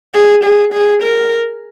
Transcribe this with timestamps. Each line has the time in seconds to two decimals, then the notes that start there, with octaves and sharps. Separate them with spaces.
0.14 G#4
0.44 G#4
0.73 G#4
1.03 A#4